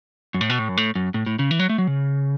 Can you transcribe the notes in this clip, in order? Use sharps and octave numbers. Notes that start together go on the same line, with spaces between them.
F#2
A2
B2
A2
F#2
A2
F#2
A2
A2
C#3
E3
F#3
A3
F#3
C#3